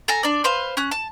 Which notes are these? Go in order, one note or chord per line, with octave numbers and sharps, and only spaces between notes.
A4 G#5 A#5
D4 D5
B4 C5 F5
C#4 F#6
A5